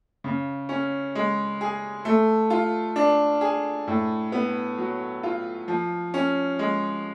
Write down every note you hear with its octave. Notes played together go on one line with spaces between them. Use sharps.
C#3
C#4
G#3
G#4
A3
F4
D4
G#4
A2
B3
F#3
F4
F3
C#4
G#3